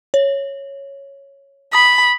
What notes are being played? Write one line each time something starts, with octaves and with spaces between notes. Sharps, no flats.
C#5
B5 D#6